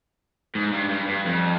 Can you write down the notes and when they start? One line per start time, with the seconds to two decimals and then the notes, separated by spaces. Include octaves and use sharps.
0.55 G#2
0.72 G2
0.90 G2
1.08 G2
1.25 F2